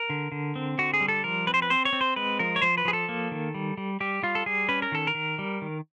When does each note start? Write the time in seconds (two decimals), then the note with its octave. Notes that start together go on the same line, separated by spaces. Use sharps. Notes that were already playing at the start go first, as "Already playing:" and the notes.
Already playing: A#4
0.10 D3
0.32 D3
0.56 C4
0.78 D3 F#4
0.94 G#4
1.01 G3
1.08 A4
1.24 F3 A#4
1.47 C4 B4
1.54 C5
1.62 B4
1.70 C4 C5
1.85 C#5
1.93 C4
2.01 C5
2.16 G#3 B4
2.39 F3 A#4
2.56 C#5
2.62 F3 C5
2.78 B4
2.85 F3 G#4
2.93 A4
3.09 A#3
3.31 D#3
3.54 G3
3.78 G3
4.00 G3 G4
4.23 G3 F4
4.35 A4
4.46 G3 G#4
4.69 C#4 B4
4.82 A#4
4.92 D#3 A4
5.07 A#4
5.15 D#3
5.39 G3
5.62 D#3